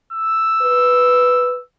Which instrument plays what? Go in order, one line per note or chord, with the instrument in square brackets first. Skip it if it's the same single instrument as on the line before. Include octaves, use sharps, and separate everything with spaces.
[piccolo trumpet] E6
[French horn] B4